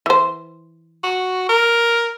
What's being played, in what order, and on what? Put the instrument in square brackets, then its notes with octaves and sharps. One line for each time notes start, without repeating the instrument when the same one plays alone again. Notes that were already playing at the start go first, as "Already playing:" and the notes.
[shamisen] E3 C5
[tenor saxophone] F#4
A#4